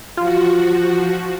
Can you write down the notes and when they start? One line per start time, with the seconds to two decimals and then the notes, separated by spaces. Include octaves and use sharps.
0.17 F3 F4 F#4